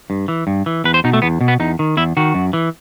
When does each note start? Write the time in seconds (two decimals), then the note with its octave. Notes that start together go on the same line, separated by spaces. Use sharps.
0.10 G2
0.28 E3
0.47 G2
0.66 E3
0.84 E2 B4
0.94 C5
1.04 B2 D#4
1.13 A3
1.22 E2 B3
1.41 B2
1.48 B3
1.60 E2 D#4
1.79 D#3
1.97 E2 E4
2.17 D#3 F#4
2.34 F#2
2.53 E3